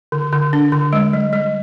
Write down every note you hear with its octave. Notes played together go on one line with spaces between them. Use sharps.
D3
D3
D4
D3
G#3
G3
G3